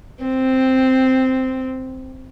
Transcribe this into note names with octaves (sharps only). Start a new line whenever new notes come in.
C4